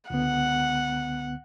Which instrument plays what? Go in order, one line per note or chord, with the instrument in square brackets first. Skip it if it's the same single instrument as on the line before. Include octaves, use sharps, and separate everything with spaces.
[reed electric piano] C#2 D3 B3 [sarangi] F#5